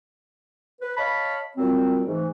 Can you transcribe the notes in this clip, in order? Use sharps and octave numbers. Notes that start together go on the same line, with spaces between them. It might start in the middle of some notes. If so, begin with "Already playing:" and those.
B4
C#5 D#5 F5 A5 B5
A#2 F#3 G3 C4
G#2 E3 A3